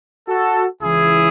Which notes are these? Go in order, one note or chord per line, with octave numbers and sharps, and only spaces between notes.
F#4 A4
C#2 C#3 E3 E4 G#4